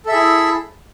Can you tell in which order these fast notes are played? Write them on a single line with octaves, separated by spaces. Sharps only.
A4 E5 G#4 E4